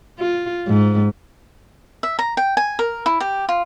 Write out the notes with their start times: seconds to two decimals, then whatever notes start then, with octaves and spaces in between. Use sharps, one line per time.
0.19 F4
0.67 G#2
2.03 E5
2.19 A#5
2.37 G5
2.57 G#5
2.79 A#4
3.06 E4
3.20 G4
3.49 F4